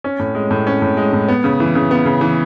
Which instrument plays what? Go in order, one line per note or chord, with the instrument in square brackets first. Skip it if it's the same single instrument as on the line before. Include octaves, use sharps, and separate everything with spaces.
[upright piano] C#4
A2
G#3
A2
C#4
A2
G#3
A2
B3
C#3
E3
C#3
B3
C#3
E3